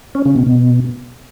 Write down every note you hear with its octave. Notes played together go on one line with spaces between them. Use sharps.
C#4
C#3
B2
B2